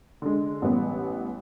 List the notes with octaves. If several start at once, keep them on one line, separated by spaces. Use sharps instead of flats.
D3 G#3
A1 G3 B3